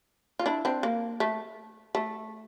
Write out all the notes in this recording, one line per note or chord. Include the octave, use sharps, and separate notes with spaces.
F4
D4 E4
C4 D4
A#3
A3
A3